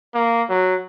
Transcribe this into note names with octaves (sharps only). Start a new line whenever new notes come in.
A#3
F#3